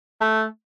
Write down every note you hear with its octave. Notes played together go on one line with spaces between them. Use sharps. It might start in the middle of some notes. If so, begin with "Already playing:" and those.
A3